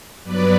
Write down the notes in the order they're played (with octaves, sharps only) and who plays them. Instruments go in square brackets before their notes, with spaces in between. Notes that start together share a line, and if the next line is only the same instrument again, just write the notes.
[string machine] G2 F#3 B3 B4 D5